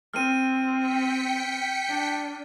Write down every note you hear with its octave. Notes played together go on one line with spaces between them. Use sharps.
C4 F6 D#7
G5 B6 C#7
D4